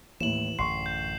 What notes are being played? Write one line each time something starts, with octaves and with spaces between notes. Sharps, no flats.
D#2 A2 E3 E7 F#7
A1 F#2 D3 C6 C#6 C7
G6